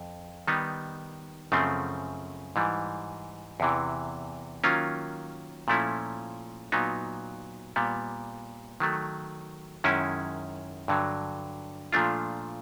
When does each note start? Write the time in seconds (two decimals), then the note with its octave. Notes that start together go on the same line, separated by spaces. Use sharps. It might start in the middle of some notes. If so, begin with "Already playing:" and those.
Already playing: F2
0.48 D#3 G3 B3 D#4
1.52 F#2 C#3 F3 A3 C4
2.56 G#2 E3 G3
3.60 E2 C3 E3
4.64 D#3 F#3 A#3 C#4 F4
5.68 A#2 F3 A3 C#4 E4
6.72 A#2 F#3 B3 D#4
7.76 A#2 G3 B3
8.80 D#3 F#3 A3
9.84 F#2 D#3 G#3 C#4 E4
10.88 G2 D3 F#3
11.93 A#2 F3 A3 D4 F4